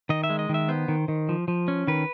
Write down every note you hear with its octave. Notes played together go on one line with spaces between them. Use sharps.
D#3 D#5
E5
G#3
D#5
D#3 E5
B3 C5
D#3
D#3
F3
F3
C#4
D#3 B4